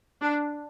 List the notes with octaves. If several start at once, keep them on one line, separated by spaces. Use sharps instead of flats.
D4